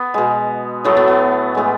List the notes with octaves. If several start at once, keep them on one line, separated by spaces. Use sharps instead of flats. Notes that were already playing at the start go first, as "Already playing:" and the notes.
Already playing: B3
B2 G#3
A2 F#3 A3 B3
B3
B3
A2 E3 G#3